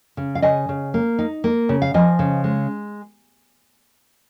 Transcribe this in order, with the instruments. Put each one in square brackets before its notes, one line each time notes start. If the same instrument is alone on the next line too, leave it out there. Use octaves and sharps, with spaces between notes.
[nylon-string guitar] C#3
F5
C#3 D#5 G#5
C#3
A#3
D#4
A#3
C#3
F5
F3 D#5 G#5
C#3
G#3